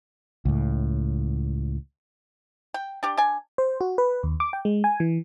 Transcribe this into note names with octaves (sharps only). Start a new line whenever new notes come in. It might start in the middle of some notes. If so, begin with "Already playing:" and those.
C#2 A2
G5
D4 G4 D5
D4 G#5
C5
F#4
B4
D#2
D6
G5
G#3
G#5
E3